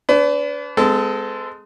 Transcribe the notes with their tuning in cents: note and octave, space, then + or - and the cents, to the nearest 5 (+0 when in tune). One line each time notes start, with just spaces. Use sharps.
D4 -35 B4 +30
G#3 +0 C4 -45 A4 +0